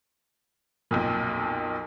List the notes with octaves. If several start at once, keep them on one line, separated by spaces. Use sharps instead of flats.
B1 F2 A#2